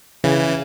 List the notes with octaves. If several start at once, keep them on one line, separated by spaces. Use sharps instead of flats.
C#3 E3